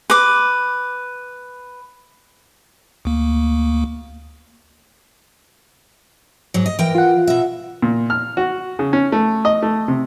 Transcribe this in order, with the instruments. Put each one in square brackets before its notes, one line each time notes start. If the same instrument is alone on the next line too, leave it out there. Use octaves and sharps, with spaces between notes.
[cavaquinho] B4 D6
[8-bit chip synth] D2 A#3
[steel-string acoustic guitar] G#2 F#3
D#5
E3 A#4 G5
[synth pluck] F4 F#5
[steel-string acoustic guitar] B2 E5
[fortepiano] A#2
F6
F#4
C#3
C#4
A3
D#5
A3
C3